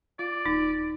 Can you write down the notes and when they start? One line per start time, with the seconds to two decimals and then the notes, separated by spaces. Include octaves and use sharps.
0.19 F4 D5
0.46 D#1 D#4